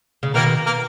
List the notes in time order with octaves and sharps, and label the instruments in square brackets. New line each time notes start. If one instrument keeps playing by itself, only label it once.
[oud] C#3
[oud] B2 D#3 [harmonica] A#3 A#4
[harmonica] A#3 A#4